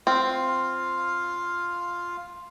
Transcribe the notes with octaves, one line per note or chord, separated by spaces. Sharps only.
C4 F4 F5